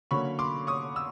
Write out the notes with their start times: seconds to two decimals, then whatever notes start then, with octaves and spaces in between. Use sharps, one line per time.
0.11 D3 F#3 A#3 C#4 B5 C#6
0.39 C6 D6
0.67 C#6 D#6
0.96 E6